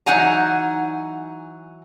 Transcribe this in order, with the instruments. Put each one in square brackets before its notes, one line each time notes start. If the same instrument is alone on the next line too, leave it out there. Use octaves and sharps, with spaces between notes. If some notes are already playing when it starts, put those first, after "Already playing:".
[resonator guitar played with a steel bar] E3 F#3 D#4 F#5 G#5 A#5